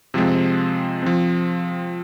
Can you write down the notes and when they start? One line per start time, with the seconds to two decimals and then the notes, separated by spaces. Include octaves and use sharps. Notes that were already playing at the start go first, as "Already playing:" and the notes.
0.14 C3 F3 G#3 C4
1.02 F3 C4